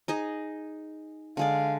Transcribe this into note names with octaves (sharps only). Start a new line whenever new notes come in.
D#4 G#4 D#5
D3 G#3 D5 F5